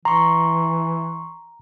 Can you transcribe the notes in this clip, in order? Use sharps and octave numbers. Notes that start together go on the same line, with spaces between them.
E3 A#5 C6 C#6